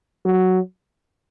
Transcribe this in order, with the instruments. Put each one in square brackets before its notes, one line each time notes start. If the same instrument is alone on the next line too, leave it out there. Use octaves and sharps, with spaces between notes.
[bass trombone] F#3